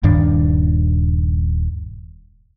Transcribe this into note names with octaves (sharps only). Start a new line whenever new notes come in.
D#1 G2 D#3 D4